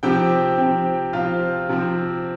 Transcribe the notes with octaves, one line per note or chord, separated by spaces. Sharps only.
C3 F3 C4 G4 G5
C3 F3 C4
C3 F3 C4 F4 F5
C3 F3 C4